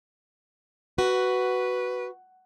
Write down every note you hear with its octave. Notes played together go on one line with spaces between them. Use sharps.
F#4 B4